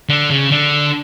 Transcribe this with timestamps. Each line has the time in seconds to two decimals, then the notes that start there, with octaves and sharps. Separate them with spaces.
0.09 D3
0.30 C#3
0.51 D3